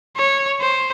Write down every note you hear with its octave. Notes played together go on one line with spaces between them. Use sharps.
C#5
C5